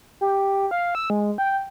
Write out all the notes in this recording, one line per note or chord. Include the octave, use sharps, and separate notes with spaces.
G4
F5
E6
G#3
G5